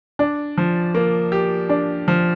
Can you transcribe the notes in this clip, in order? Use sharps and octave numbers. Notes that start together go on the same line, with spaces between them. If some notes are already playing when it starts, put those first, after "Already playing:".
D4
F3
A#3
G4
D4
F3